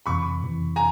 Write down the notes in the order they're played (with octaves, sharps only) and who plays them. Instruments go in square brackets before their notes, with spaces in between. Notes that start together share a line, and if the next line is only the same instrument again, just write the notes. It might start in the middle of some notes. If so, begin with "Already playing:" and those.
[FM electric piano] F2 C3 E3 [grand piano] B5 C#6
[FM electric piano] F2 C3 E3
[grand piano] G#5 A#5